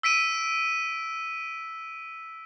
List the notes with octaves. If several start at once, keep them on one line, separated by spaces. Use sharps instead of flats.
E6 B6 D7 D#7